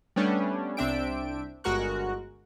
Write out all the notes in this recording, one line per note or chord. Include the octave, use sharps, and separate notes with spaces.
G3 A3 B3 C#4 D4 G4
C2 C4 D4 E5 G5 D7
G1 G#3 F#4 A#4 C#6 F#6